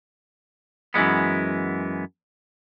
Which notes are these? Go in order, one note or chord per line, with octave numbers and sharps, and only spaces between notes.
F#2 E3 F#3 G#3 B3